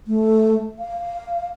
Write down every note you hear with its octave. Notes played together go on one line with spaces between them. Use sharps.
A3
F5